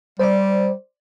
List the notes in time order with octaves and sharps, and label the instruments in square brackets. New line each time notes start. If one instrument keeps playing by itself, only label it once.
[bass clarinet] G3 [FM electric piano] C5 D5